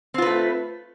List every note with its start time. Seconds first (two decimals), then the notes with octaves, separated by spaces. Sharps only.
0.14 C4
0.18 F4
0.22 B4
0.26 A3